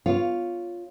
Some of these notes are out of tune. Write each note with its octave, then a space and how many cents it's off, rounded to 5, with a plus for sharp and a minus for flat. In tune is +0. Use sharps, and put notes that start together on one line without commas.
F4 +0 C#5 +0